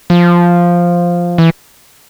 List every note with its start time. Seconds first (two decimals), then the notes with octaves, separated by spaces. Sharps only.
0.10 F3
1.38 E3